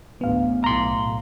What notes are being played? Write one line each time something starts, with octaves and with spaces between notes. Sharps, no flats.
A1 D2 B3 F5
B1 A2 A#5 C6